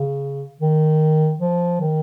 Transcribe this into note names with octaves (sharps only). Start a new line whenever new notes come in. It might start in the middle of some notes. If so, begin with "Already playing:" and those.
Already playing: C#3
D#3
F3
D#3